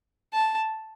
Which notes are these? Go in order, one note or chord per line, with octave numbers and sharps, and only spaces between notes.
A5